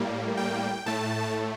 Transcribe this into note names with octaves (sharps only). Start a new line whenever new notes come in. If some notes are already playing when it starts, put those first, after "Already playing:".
Already playing: A2 G3 A#3
G5
A2 A3 A5